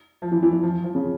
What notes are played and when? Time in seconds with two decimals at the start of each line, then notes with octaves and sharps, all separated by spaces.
0.22 F3
0.32 E3
0.43 E3
0.53 E3
0.63 F3
0.84 F3
0.95 C#3